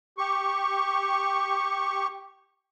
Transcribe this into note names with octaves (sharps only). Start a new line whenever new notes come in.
G4 C#6